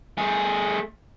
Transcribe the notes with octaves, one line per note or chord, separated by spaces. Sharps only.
A3 G#4